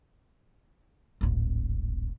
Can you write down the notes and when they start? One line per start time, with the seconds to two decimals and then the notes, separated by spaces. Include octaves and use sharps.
1.21 D1 G#1